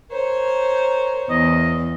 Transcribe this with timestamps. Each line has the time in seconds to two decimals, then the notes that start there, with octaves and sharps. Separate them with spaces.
0.11 A#4 C5 C#5
1.30 E2 D#5